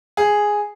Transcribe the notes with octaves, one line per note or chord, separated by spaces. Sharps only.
G#4